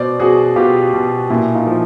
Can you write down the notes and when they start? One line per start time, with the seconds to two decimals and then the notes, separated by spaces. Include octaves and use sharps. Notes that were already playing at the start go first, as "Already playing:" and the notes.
Already playing: B2 C5 D5
0.20 B2 F#4 G#4
0.56 B2 F4 G4
0.93 B2
1.30 A#2 E4 F#4
1.55 D#4 F4
1.67 F3